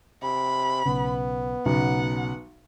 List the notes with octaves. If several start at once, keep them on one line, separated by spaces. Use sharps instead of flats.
C3 B5
B1 C#3 B3
B1 C#3 F#5